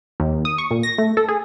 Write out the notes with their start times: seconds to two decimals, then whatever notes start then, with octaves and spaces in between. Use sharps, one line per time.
0.20 D#2
0.45 D#6
0.58 C#6
0.71 A#2
0.83 A#6
0.98 A3
1.17 A4
1.29 G#4